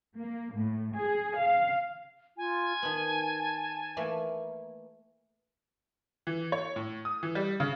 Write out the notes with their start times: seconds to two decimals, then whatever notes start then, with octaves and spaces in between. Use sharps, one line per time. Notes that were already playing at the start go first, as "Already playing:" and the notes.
0.18 A#3
0.53 A2
0.98 G#4
1.38 F5
2.37 F4 G#5
2.82 D#3 B3 A5
3.97 E3 A3 A#3
6.27 E3
6.52 C#5
6.76 A2
7.05 D#6
7.23 E3
7.35 G3
7.60 C#3